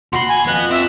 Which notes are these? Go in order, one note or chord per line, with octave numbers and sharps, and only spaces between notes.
D#2 F#4 B5 C6
G#5
F2 B3 F#6
C4 F4 E5